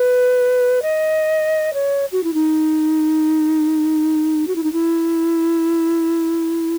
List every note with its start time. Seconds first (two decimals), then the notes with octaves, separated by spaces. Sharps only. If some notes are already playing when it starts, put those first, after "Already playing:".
Already playing: B4
0.82 D#5
1.74 C#5
2.12 F#4
2.24 E4
2.34 D#4
4.47 F#4
4.56 E4
4.63 D#4
4.73 E4